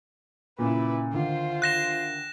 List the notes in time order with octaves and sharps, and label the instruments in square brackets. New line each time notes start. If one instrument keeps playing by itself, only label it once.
[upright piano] A#2 C#3 [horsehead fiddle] E4 B4
[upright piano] D2 D#3 [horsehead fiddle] F4 C5
[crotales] F#6 A#6 E7